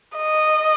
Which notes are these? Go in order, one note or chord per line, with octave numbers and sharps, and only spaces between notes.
D#5